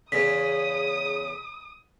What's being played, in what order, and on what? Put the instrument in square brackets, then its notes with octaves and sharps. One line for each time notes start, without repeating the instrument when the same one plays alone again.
[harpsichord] E2 C#3 [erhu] D#6 [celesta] B6